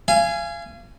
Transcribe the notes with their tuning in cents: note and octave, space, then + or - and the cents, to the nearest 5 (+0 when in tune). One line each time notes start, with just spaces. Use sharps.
F5 -35 G#5 +0